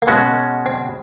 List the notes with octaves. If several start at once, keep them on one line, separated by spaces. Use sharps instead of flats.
A#3
B2 G#3 B3 C#4 F#4
C4